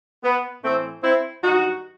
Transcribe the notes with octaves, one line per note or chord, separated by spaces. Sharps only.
B3
A2 E3 A3 C4
C4 E4
G2 D#3 F#3 D#4 F#4